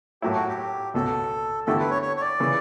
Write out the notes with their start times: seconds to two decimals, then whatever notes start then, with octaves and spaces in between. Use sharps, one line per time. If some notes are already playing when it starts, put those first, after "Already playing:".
0.22 A2 F#3 A3 E4 G4
0.34 F#4
0.48 G4
0.94 C#2 B2 A3 A4
1.66 E2 D3 A3 E4 G4 A4
1.79 B4
1.91 C#5
2.02 C#5
2.17 C#5
2.21 D5
2.40 C#3 E3